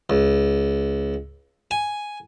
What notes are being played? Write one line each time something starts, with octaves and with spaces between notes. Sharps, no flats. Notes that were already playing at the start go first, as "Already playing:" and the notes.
C#2
G#5